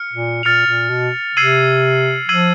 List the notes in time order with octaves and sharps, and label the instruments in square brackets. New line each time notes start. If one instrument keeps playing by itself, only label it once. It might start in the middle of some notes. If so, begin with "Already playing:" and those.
Already playing: [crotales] F6 C#7
[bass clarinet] A#2
[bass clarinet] A#2 [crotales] F6 A6 C#7 F7
[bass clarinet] A#2
B2
[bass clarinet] C3 [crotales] E6 G#6 C7 D#7 F#7
[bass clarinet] F3 [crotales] E6 G#6 C7 D#7 F#7